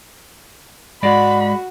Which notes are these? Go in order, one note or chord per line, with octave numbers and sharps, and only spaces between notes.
G#2 G#3 F#4 D5 B5